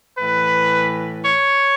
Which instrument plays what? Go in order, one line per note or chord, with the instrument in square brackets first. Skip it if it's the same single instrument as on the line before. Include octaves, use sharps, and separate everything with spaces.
[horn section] A2 E3 B4
C#5